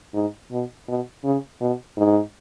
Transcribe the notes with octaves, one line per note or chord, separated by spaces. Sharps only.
G#2
B2
B2
C#3
B2
G#2